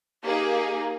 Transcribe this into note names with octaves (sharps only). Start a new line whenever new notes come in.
A#3 D#4 G4 G#4